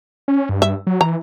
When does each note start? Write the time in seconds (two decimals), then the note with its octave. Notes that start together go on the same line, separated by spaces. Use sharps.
0.28 C#4
0.49 G2
0.62 E5
0.87 F#3
1.01 E3 A#5